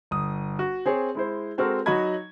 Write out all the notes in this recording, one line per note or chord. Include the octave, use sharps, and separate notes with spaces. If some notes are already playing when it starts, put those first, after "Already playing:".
G1 D#6
F#4
C4 G#4 C#5
G#3 E4 C5
G#3 C4 F#4 A4 A#4
F#3 D#4 F#4 D#5 B5 G#6